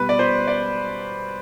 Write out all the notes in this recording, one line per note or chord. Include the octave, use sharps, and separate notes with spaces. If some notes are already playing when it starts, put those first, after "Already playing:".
Already playing: B2 G3 B4
D5
C5
D5